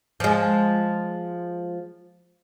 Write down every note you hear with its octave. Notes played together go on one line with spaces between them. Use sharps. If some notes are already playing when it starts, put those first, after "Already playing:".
F3 G#3